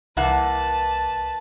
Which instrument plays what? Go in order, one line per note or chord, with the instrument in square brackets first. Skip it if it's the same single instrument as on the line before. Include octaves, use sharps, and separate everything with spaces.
[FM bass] C2 [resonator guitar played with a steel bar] E3 A#3 F#5 [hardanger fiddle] B4 A5